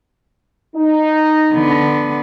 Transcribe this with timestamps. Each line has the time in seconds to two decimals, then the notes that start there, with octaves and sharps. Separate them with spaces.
0.75 D#4
1.54 D3 B3